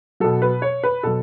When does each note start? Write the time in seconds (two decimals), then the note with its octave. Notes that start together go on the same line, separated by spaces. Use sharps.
0.20 B2 F#3 A4
0.42 B4
0.62 C#5
0.83 B4
1.03 B2 F#3 A4